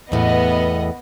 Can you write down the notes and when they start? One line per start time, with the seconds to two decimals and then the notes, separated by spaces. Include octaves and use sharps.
0.12 E2 A2 B3 D#5